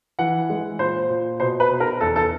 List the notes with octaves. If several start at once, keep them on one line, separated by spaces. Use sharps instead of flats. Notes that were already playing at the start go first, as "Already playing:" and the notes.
E3 F#5
G#3
A#2 C5
A#2
B2 C5
B4
B2
A#4
E2 A4
A4